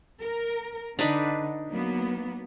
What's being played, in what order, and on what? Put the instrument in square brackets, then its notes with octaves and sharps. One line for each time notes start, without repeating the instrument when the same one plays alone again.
[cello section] A#4
[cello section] D3 [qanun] D4 D#4 B4
[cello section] F#3 A#3 B3